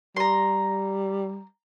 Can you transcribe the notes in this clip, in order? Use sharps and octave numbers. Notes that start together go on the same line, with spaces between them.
G3 A#5 C6